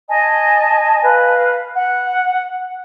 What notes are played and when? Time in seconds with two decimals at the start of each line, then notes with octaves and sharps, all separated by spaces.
0.09 D#5 G#5 A5
1.03 B4 F5
1.75 F#5